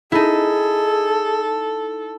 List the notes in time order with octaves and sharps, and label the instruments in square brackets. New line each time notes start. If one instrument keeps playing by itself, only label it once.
[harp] D#4 E4 [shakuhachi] G#4 [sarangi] A4